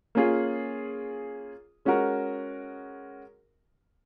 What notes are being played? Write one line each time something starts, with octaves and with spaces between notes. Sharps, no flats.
A#3 C#4 F4 G#4
G#3 C#4 F#4 A#4